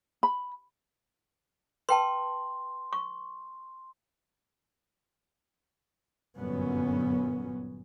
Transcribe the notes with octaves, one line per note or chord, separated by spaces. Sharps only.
B5
B4 G5 A5 C6
C#6
G1 F#2 A#2 F#3 B3 C#4